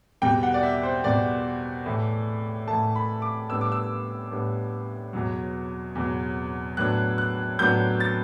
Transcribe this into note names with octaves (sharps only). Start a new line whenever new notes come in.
E2 B2 G3 G5
F#5
D5
E5
C5
E2 B2 G3 D5
A2 E3 A3
A2 E3 A3 A5
B5
D6
A2 G3 B3 D4 E6
D6
E6
A2 G3 B3 D4
E2 B2 F#3
E2 B2 F#3
A2 F#3 B3 D4 F#6
F#6
A2 F#3 B3 D4 G6
A6